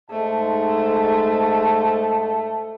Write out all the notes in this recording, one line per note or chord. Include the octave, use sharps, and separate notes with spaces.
G#2 A3 C5 D#5 A5